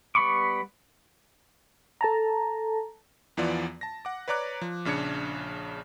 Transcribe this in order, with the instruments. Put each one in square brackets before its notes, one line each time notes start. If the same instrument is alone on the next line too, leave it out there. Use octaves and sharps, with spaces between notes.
[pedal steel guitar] G3 B3 B5 C#6 D6
[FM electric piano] A4 A5 A#5
[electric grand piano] E2 E3 F3 B3 F4 D5
A5 A#6
F#5 D6
B4 C#5 D5 A#5 D6 F#6
F3
A#1 C#3 D4 G#6 C#7